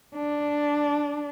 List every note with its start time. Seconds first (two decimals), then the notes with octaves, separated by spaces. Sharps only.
0.15 D4